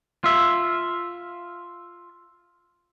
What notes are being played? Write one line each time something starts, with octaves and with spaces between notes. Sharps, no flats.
F4 E5